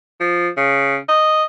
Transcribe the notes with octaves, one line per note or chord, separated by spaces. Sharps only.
F3
C#3
D#5